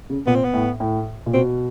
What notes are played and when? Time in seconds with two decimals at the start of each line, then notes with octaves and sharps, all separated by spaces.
0.10 C#3
0.27 A#2 B3
0.35 C4
0.44 B3
0.53 A2
0.80 A2
1.26 A#2
1.33 B2 C4